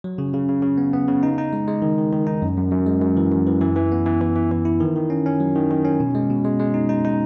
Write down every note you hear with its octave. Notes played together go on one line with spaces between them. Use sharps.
F#3
C#3
C#3
C#3
C#3
B3
B3
C#3
D#4
D#4
G#3
G#3
D#3
D#3
D#3
D#4
F#2
F#2
F#2
G#3
F#2
E3
F#2
E3
E3
E3
B3
E3
E3
E3
E3
E4
D#3
D#3
C#4
C#4
F#3
D#3
D#3
C#4
B2
G#3
B2
G#3
G#3
D#4
D#4
D#4